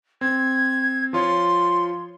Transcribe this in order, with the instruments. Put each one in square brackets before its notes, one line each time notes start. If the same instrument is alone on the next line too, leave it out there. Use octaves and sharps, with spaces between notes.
[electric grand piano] C4 [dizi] G#6
[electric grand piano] F3 F4 C#5 [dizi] C6